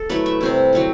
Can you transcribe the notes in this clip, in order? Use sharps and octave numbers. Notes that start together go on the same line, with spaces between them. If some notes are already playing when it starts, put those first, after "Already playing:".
Already playing: A4
F#3 A3 E4 B4
E5
C3 G3 C4 E4
F#3 C4 E4